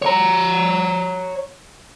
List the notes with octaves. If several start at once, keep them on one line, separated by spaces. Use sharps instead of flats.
C#5 A#5